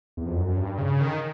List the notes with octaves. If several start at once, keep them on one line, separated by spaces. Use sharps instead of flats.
E2
F2
F#2
G2
C#3
D#3